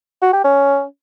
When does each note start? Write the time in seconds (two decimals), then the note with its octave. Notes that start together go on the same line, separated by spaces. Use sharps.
0.22 F#4
0.33 G4
0.44 C#4